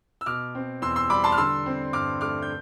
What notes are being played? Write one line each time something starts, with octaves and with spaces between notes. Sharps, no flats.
E6
B2 D6 F6
C4
E2 C6 E6
C6 E6
G3 B5 D6
A5 C6
F6
D3 C6 E6
C4
G2 D6 F6
A3 D6 F6
G6